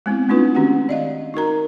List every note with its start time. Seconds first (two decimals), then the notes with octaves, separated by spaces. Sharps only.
0.06 G#3 B3 C4 E4
0.29 A3 C4 D4 D#4 F4 B4
0.55 D#3 C#4 F#4 G4 F#5
0.89 D5 D#5 F5
1.34 D#4 F#4 A#4 A#5